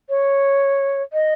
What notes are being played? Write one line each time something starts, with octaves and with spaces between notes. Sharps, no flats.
C#5
D#5